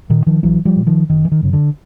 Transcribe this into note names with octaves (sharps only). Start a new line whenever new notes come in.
A#2 D#3
D#3 F3
A#1 E3 F#3
F3 G3
A#2
D#3 F3
F#1 D#3
E3
D#3
F#2 C#3
D3